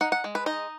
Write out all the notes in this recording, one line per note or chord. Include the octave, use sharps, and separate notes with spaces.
D#4 F#5
F#5
G#3
B4
D#4 D#5